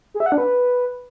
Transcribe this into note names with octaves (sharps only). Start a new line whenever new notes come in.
G#4
E5
F#5
D4
B4